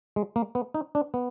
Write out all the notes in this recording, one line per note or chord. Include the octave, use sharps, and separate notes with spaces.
G#3
A#3
B3
D#4
D4
B3